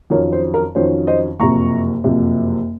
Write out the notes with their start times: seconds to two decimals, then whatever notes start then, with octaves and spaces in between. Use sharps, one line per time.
0.10 F2 D#3 F#3 C#4 A#4 C#5
0.32 C5
0.54 A#4
0.75 F2 D#3 F#3 C#4 C5
1.07 C5 D#5
1.39 F#1 F2 C3 A#5 C#6
2.04 F#1 F2 C3